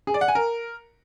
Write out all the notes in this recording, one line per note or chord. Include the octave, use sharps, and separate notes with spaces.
G#4
D5
F#5
G#5
A#4